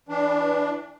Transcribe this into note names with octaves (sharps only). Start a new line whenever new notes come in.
E3 D4